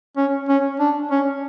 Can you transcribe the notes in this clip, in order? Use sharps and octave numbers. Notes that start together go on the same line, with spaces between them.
C#4
C#4
D4
C#4